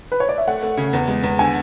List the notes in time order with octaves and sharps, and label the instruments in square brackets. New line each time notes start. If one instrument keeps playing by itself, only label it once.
[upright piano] B4
C#5
D5
E5
[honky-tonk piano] A3 [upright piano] F#5
[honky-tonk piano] A3
C#3
E2
G#3
E2
[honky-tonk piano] D3 [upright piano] G#5